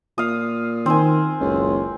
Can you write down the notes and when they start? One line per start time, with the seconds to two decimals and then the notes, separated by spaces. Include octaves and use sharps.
0.18 A#2 F5 D#6
0.86 D#3 C4 C5 G#5
1.41 F#1 C#2